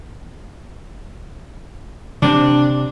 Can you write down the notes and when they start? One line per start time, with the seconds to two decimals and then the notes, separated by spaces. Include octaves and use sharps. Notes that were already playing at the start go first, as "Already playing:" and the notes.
2.22 C3 D4